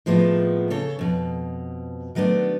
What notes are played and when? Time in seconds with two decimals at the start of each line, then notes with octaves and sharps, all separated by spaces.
0.06 A2 F3 G#3 A#3 B3 E4
0.70 C#3 A4 C#5
0.99 F2 B2
2.15 D#3 F#3 A3 B3 D4